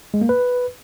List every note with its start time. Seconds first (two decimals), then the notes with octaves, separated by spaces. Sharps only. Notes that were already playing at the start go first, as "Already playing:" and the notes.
0.14 G#3
0.21 A#3
0.29 B4